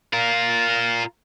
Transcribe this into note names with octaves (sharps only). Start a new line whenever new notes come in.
F4 A#4